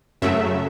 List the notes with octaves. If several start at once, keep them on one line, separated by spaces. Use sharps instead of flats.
F#2 C#3 F#3 A3 E5